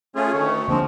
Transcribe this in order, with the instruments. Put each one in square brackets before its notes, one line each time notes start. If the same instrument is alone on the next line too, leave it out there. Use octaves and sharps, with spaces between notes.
[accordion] A3 F4 G#4 [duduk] C#4
[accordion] D2 D#3 A3 [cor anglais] C#5
[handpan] D3 A#3 D4 [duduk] F3 [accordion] G#3 C4